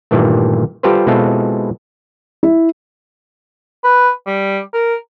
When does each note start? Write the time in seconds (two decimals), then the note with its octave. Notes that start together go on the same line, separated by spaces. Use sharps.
0.11 G2 A#2 D#3 E3 A3
0.83 G3 F4 G4 A4 B4 C5
1.07 B2 G#3 C4 E4 F4 A4
2.43 E4
3.84 B4
4.27 G3
4.74 A#4